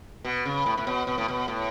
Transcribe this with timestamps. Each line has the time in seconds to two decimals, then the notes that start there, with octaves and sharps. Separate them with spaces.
0.25 B2
0.45 C#3
0.66 A2
0.77 A2
0.87 B2
1.07 B2
1.18 A2
1.28 B2
1.48 A2